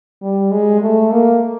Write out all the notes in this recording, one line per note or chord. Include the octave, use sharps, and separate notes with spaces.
G3
G#3
A3
A#3